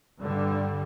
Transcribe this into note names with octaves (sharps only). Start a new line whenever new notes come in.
G2 D3 G3